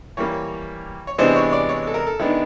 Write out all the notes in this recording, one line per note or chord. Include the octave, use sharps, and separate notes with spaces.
E3 G3 A#3 C#5
C#5
C3 E3 G#3 B3 D4 C5
C#5
D5
C#5
A4
A#4
A4
D#3 G#3 B3 D4 E4